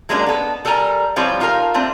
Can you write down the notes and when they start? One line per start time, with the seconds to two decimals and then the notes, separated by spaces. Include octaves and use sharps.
0.09 F#3 G#3 A#3 C#4 D4 G4
0.26 B3 A4
0.65 G3 A4 A#4 G#5 A#5
1.16 E3 F3 G3 C4 F4 C#5
1.40 D#4 F4 A4 A#4 F5
1.74 G3 A3 C4 D4